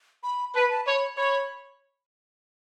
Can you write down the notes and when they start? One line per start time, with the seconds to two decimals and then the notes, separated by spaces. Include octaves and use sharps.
0.23 B5
0.54 B4 A5
0.62 B5
0.70 A5
0.86 C#5 B5
1.17 C#5 B5